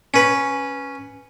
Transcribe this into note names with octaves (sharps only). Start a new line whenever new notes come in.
C#4 B4